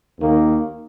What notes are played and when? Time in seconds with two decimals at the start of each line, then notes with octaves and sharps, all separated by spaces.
0.18 D#2 D#3 A#3